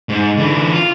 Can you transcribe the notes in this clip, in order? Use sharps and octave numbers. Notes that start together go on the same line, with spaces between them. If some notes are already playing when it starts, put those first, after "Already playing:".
G#2
D3 E3
F4